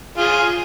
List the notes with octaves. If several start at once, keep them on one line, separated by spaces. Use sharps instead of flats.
F4 G#4